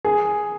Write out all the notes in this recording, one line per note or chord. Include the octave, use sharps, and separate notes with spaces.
G#4